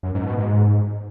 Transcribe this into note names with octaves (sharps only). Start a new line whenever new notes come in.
F#2
G#2
B2
G#2